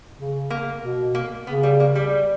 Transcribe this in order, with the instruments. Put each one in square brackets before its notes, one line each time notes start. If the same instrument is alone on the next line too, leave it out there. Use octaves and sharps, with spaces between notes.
[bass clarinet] C#3
[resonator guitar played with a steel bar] A#3
[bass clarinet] B2
[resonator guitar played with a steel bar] A#3
[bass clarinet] C#3 [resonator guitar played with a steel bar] B3
[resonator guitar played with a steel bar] G3
A#3
G3